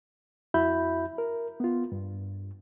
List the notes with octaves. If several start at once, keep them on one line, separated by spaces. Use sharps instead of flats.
F2 E4 F#4 E5 B5 G6
A#4
B3 F4
G2